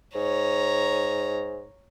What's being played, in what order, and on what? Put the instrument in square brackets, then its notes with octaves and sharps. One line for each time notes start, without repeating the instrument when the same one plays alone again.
[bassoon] G#2 [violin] C#5 A#5